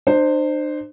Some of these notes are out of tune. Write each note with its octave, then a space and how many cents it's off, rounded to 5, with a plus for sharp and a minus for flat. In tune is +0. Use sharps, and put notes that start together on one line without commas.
D4 +45 C5 +0